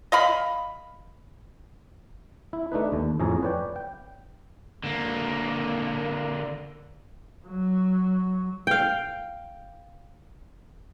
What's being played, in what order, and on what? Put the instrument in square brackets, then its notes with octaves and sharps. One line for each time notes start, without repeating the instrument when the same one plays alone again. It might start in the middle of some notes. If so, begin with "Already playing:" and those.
[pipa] D#5 F5 B5
[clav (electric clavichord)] E4
A3 D4 D#4 B4
D#2
F2 A2 C#4 G#4 A#5
B4 C#5 D5 G5
G5
[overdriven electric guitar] D3 A#3
[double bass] F#3
[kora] F5 G5